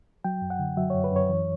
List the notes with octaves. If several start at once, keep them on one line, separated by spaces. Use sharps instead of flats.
F#3 G5
F#2
F#5
D3
F#3 E5
F#2 C#5
B4
F#2 C#5
E3